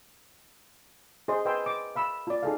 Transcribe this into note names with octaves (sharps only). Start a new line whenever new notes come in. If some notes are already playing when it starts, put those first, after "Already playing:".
G#4 C5 D#5 C6
B4 D#5 G5 G#5 C6 E6
D6
F5 B5 E6
F4 D5
D#4 G#4 A4 F5